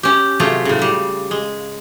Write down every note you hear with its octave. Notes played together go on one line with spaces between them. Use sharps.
C#4 G4
C3 F#3 A3 F4 G#4
A2 C#3
C#3 G3
G#3